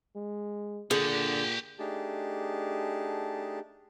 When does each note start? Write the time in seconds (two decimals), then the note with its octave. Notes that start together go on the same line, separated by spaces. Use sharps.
0.16 G#3
0.91 A#2 D3 G4 G#4 F#5
1.79 A3 D4 D#4 G4 G#4 A5